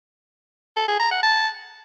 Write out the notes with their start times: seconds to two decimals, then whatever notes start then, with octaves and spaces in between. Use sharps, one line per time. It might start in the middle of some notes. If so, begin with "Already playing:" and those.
0.77 A4
0.88 G#4
1.00 A#5
1.11 F#5
1.23 A5